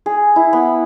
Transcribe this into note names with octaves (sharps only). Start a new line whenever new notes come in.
G#4
E4
B3